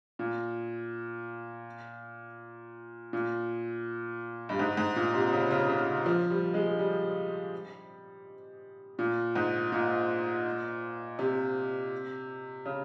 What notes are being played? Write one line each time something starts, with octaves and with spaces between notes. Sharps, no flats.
A#2
A#2
G2
G#2
G#2
A#2
C3
C#3
C#3
C#3
F3
G3
G#3
G3
A#2
G#2
A#2
C3
C#3